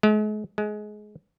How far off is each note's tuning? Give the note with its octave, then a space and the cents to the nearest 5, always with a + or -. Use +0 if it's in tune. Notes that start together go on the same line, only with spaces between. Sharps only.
G#3 +40
G#3 +20